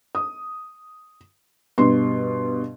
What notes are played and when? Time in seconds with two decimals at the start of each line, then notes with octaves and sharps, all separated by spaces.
0.15 D#6
1.78 G2 B2 C6